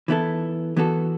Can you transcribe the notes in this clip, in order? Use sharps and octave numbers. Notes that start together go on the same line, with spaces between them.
E3 B3 E4 A4
E3 B3 F#4 A4